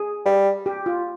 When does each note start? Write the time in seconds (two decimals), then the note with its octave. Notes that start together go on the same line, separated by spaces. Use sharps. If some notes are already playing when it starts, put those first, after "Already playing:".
Already playing: G#4
0.26 G3
0.66 G4
0.86 F4